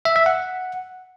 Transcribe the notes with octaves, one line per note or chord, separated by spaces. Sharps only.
E5
E5
F#5